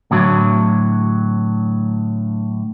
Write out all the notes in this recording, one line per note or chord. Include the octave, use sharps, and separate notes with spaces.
A2 D3 F#3